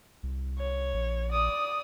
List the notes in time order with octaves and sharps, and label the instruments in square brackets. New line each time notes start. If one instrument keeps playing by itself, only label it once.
[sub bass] C2
[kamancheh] C#5
[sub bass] A#1
[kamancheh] D5 D#6